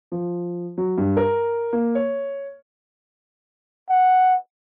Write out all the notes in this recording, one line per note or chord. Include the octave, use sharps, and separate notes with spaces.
F3
F#3
G2
A#4
A#3
C#5
F#5